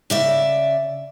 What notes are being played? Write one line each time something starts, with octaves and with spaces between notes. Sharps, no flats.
C#3 D5 E5